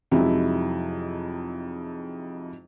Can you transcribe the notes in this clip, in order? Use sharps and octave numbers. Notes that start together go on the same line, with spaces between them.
F2 C3 F#3 G#3 D#4 E4